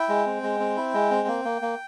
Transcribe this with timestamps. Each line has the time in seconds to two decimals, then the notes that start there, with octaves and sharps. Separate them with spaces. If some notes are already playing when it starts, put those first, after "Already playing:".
Already playing: E4 G5
0.09 G#3
0.26 C4
0.43 G#3
0.60 C4
0.77 E4
0.94 G#3
1.11 C4
1.28 A#3
1.45 A#3
1.62 A#3